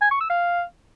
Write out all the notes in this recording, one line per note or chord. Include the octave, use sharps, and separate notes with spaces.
G#5
C#6
E6
F5